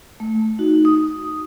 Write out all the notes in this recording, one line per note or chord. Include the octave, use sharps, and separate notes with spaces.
A3
D#4 F#4
D#6